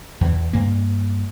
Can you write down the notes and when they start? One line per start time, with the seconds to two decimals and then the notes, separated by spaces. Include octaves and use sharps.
0.21 E2 E3
0.53 G2 A#3